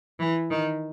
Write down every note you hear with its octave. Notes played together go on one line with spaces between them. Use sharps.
E3
D#3